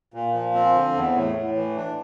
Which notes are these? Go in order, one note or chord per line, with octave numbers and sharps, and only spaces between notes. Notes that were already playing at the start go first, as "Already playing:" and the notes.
A#2
F3
C4
D3
E2
A2
A2
E3
D4